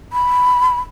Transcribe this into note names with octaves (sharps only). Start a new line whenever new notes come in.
B5